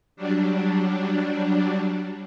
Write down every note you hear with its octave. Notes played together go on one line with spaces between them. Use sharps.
F#3 G3 D4